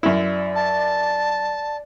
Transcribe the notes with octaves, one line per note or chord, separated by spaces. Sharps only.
F#2 E4 D5
A5